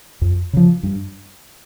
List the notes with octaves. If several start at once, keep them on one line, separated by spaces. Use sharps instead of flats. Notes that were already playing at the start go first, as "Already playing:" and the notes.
F2
C#3 F3
G2